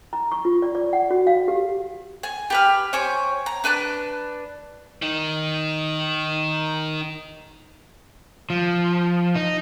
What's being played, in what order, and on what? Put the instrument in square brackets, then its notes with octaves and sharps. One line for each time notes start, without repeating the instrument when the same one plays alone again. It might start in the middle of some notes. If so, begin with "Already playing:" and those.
[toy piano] A#5
C#6
F4
D5
D5
F#5
F#4
F5
G4
[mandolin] G#5
G4 B4 F6
C5 C#5 G#5 D6
A#5
D4 B4 A5 F#6
[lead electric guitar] D#3 D#4
[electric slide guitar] F3
D#4